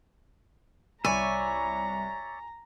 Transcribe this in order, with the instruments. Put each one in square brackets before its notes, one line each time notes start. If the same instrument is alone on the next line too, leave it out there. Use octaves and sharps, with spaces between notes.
[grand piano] C2 B5 C#6 [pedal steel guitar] C#5 D5 E5 [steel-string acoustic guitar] G#5 [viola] A#5